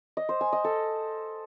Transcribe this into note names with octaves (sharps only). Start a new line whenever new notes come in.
D#5
C5
G#5
D#5
A4